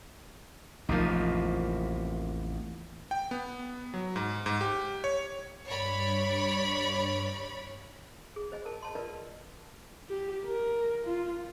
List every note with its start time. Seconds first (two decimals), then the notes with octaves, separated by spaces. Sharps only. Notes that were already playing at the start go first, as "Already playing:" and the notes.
0.89 A1 E2 C3 F3 A#3 D#4
3.11 G5
3.31 B3
3.94 F#3
4.16 G#2
4.46 G#2
4.61 G4
5.04 C#5
5.65 G2 C#5 D5 B5
8.36 G#4
8.52 C5 D#5 G#5
8.65 A#4 A5
8.82 A5 C6
8.95 F4 A#4 B4 D5 D#5
10.08 G4
10.45 A#4
11.04 F4